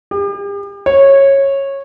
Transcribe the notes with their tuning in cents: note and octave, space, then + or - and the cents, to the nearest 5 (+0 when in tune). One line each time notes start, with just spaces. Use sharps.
G4 +40
C#5 -15